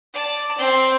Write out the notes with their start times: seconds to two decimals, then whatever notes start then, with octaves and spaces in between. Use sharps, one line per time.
0.14 D5 A5
0.58 C4